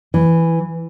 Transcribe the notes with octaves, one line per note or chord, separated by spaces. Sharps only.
E3